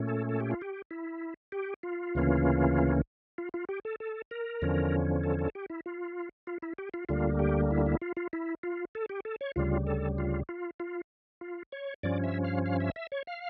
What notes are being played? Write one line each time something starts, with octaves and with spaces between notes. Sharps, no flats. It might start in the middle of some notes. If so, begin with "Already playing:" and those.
Already playing: A#2 A3 C#4
A4
A4
G4
F4
G4
E4
G4
F4
D2 C#3 E3 A#3 C#4
F4
F4
G4
A4
A4
A#4
E2 D3 F3 C#4
A4
A4
G4
E4
F4
F4
E4
G4
F4
D2 D3 G3 A#3 F4
G4
E4
E4
F4
F4
E4
F4
A4
G4
A4
C#5
D2 C#3 G3 F4
A4
F4
F4
F4
F4
C#5
G2 F3 C#4 D5
E5
F5
F5
E5
E5
C#5
F5